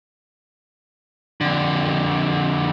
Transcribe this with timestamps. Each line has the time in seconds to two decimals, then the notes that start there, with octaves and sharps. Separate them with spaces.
1.41 F2 D3